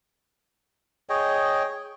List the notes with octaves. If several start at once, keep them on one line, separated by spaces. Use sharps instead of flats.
G#4 C#5 D#5 G5